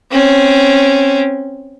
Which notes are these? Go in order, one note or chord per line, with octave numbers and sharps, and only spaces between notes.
C4 C#4